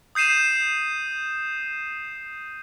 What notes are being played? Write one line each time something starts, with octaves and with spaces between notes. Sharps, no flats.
D#6 G6 C7 D#7 E7